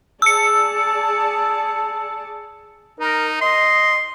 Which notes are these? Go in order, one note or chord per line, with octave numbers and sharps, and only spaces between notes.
G#4 D5 A5 E6 C#7
D#4 A#4
D#5 C6